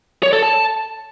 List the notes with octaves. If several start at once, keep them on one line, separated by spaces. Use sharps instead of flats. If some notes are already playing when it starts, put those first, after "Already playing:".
C#5
A4
A5